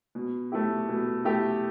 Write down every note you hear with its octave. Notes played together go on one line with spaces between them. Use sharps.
B2
A3 E4 G4
B2
A3 E4 G4